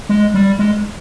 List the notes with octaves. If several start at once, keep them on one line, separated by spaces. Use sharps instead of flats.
G#3
G3
G#3